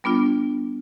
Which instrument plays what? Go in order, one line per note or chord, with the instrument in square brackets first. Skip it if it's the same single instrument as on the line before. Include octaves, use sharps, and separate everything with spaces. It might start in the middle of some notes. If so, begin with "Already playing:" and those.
[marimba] G3 B3 D4 F4